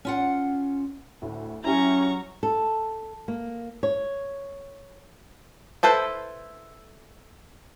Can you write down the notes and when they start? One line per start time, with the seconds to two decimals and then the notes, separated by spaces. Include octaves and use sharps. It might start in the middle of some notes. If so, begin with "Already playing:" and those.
0.05 C#4 F4 F#5
1.22 D2 A2
1.64 F#3 C#4 E4 G4 A#5 C#6
2.43 A4
3.28 A#3
3.83 C#5
5.83 E4 A4 B4 C5